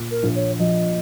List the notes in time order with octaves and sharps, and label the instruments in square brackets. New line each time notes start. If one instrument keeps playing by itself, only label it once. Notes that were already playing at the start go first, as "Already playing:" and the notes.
Already playing: [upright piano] A#2
[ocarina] A#4
[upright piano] A#1
[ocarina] C#5
[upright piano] F3 [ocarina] D#5